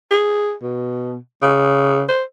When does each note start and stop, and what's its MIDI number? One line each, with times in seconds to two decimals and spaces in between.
0.11 0.54 68
0.62 1.16 47
1.42 2.02 49
2.09 2.23 72